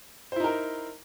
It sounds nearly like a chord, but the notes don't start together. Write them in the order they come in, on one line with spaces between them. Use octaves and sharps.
C5 E4 D#4 A#4